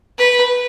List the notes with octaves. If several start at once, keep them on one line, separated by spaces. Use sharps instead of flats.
B4